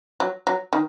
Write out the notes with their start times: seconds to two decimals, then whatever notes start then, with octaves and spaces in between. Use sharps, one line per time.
0.20 F#3
0.47 F#3
0.73 D#3